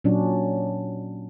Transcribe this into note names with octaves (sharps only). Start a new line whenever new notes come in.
A#2 F#3 C#4 D4